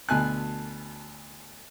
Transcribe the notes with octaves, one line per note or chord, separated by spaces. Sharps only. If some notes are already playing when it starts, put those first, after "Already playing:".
D2 B2 G#5 A5 F#6